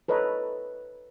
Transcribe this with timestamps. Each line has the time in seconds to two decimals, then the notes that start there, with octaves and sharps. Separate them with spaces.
0.08 A4 B4 C#5 D#5 A#5